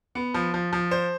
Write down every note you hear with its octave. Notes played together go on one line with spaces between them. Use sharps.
B3
F3
F3
F3
C5